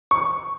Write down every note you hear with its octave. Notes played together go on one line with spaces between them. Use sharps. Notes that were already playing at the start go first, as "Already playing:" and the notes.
C#6